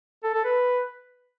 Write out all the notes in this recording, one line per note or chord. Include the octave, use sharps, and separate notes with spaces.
A4
A4
B4